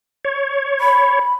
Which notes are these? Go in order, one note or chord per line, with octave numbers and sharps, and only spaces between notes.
C#5
B5